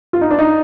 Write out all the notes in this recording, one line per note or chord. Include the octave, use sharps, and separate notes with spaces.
F4
D#4
D4
D#4